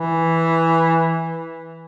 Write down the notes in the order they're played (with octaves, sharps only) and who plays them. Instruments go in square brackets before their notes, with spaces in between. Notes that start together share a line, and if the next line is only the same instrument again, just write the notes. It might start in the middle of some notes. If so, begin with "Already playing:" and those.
Already playing: [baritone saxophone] E3